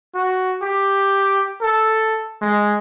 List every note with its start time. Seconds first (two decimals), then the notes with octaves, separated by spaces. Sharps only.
0.15 F#4
0.63 G4
1.62 A4
2.42 G#3